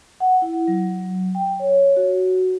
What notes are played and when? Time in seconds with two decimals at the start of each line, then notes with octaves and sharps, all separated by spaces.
0.20 F#5
0.42 E4
0.68 F#3
1.35 G5
1.60 C#5
1.97 F#4